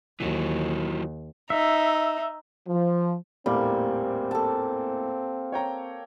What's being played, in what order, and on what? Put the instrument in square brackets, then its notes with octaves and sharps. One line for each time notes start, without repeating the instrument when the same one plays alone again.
[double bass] D#2 [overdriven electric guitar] E3 F#3
[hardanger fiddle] D#4 [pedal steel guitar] E5
[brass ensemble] F3
[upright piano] A#1 E2 A2 [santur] G3 [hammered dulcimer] A#3 [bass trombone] C4
[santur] A4 A5
[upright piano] C#5 G5 A#5